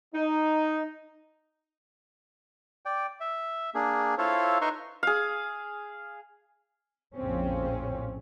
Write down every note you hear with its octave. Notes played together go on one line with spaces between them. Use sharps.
D#4
D5 G5
E5
A#3 D4 G#4
E4 F4 A4 C5 C#5 F5
D#4 B4 E5 A#5 C6 C#6
G#4 F5
A#1 F2 A2 C#3 C4 C#4